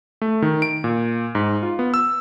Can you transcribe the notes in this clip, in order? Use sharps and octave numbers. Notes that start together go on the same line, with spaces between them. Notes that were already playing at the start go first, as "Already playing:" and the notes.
A3
D#3
D7
A#2
G#2
F4
B3
E6